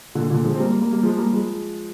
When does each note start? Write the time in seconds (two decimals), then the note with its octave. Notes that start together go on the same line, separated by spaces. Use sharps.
0.15 A#2 D3
0.30 A#2 D3
0.45 F3 G#3
0.55 C4
0.59 G3 A#3
0.71 G3 A#3
0.82 G3 A#3
0.93 G3 A#3
1.03 F3 G#3
1.18 G3 A#3
1.33 F3 G#3